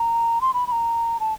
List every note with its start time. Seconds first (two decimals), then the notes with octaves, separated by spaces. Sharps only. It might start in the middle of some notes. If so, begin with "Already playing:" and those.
Already playing: A#5
0.41 C6
0.54 B5
0.67 B5
0.72 A#5
1.20 A5